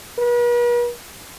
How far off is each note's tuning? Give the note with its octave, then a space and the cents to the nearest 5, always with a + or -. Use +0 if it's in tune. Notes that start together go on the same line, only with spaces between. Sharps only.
B4 -45